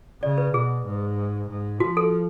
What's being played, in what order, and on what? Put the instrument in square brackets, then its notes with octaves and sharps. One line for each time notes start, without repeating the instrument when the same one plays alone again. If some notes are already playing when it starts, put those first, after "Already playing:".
[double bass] C#3 [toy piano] D5
[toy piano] B4
[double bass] B2 [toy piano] G#4
[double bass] G#2
G#2
[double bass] F3 [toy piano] F#4
[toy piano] A4